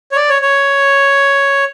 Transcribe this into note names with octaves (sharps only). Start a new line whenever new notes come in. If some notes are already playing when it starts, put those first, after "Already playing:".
C#5
D5
C#5
C#5